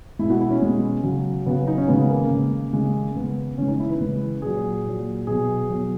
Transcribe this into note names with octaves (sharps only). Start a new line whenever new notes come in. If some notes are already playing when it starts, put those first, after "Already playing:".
B2 G#3 E4
F#4
E4
C#4
B2 G#3
C#3 F#3
C#3 F#3 B3
D#4
C#4
C#3 G#3 B3
A#3
C#3 G#3
C#3 G#3
C#3 G#3 B3
C#3 E3 G#3 C#4
D#4
E4
B4
C#3 E3 G#3
A#2 F#3 G#4
A#2 F#3
B2 F#3 G#4
B2 F#3